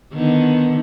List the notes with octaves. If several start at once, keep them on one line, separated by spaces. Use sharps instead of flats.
D3 D#3 B3